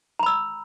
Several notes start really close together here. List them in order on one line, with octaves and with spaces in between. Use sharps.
A#5 B5 E6